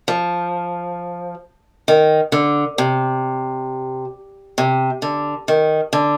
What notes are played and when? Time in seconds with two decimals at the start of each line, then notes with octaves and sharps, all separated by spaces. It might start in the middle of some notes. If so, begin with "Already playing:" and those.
0.08 F3
1.88 D#3
2.32 D3
2.78 C3
4.58 C3
5.02 D3
5.48 D#3
5.93 D3